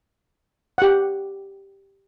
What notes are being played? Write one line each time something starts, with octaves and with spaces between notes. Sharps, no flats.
G4 F#5